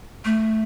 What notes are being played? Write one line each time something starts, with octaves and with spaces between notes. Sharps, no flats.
A3